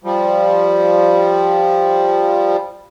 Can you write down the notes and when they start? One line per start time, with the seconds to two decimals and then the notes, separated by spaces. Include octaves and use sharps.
0.04 F3 G3